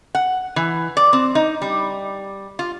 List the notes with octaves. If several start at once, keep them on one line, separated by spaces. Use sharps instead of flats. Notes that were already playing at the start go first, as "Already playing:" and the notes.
F#5
E3
D5
C4
D#4
G3
F4